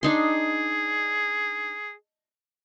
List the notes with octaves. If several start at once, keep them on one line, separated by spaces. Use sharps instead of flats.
D4 D#4 G#4 C6